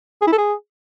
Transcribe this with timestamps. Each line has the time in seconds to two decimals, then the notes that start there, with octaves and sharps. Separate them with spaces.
0.22 G#4
0.27 E4
0.33 A4
0.38 G#4